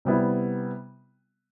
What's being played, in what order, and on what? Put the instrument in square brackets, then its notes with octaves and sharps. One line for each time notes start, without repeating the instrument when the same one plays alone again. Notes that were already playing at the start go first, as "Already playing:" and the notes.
[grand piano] C3 G3 B3 E4